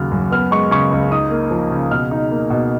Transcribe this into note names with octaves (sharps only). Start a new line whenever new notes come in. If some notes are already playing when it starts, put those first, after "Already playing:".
Already playing: D#2 C#3 F#3 A#3 F6
F#2
B3 F6
G#3 C#6
C#3 C#6
C#2
D#4 D#6
A#3
F3
C#3
B2 F6
D#4
A#3
B2